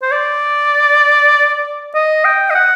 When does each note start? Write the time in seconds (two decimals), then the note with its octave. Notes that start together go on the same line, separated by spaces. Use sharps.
0.02 C5
0.11 D5
1.94 D#5
2.24 G5
2.50 D#5
2.55 F#5